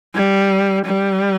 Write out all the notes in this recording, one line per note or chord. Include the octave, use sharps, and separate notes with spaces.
G3
G3